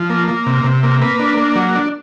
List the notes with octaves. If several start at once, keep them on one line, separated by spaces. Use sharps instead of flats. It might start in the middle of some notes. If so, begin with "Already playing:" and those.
Already playing: F3
A#3
A#3
C3
C3
A#3
A#3 B4
D4
A#3
F#3
D4